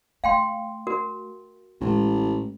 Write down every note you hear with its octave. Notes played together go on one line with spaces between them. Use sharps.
A3 F5 G5 C6
F#4 A#4
A1 A2 G#3